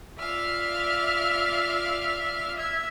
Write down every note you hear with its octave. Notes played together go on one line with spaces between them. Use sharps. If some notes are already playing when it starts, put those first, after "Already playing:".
F4 D5 E5 F5 F6
E5 G#6